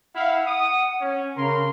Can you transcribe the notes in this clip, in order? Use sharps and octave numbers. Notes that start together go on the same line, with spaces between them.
E4 F5 F#5
D#6
C#4
C#3 A#4 C6